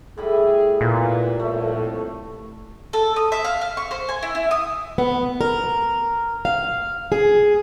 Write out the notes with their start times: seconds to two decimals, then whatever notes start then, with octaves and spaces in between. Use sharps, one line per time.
0.18 A2 G3 G#4 B5
0.81 A#2 B3 E4 B4
1.39 F2 A2 G3 A3
2.93 A4
3.16 D#6
3.32 E5
3.44 F5
3.61 F5
3.77 C#6
3.91 C5
4.09 G#5
4.23 E4
4.35 E4
4.51 D#6
4.98 B3
5.41 A#4
6.45 F5
7.12 G#4